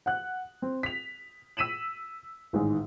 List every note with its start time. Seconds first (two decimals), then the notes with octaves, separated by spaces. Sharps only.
0.06 F#5 F#6
0.62 C4
0.83 B6 F7
1.57 E6 B6 D#7 E7 F#7
2.53 A1 G#2 D#3 G#3